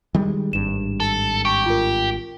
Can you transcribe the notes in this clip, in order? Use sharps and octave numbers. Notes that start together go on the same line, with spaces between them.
D#3 G3 G#3
G#1 G2 E7
A4
G4 C#6
F4 A#4